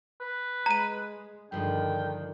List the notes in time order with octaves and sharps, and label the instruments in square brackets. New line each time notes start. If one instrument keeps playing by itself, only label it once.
[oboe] B4
[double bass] G#3 [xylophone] A#5 D#7
[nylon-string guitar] G2 F3 G#3 [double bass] D3 D#3 [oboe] G5